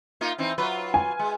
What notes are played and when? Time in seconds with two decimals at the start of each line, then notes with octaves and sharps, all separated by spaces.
0.21 A#3 D#4 F4
0.38 E3 C4 D#4
0.58 F#3 F4 B4
0.94 G#5
1.19 G#3